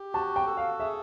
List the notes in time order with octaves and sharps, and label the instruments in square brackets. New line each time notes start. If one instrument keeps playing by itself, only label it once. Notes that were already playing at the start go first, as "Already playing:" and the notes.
Already playing: [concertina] G4
[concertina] F#4 [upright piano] A5
[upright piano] G5
[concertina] A4
[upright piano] F5
[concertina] G#4 [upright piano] E5